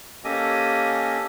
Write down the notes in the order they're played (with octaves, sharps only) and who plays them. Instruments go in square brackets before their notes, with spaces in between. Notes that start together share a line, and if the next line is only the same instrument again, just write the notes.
[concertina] A#3 C#4 G4 A4 D#5 G#5